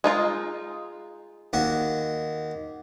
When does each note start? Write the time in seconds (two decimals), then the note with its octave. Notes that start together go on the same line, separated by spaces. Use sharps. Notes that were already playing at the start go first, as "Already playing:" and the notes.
0.04 G#3 D#4 F4
1.53 D#2 F#4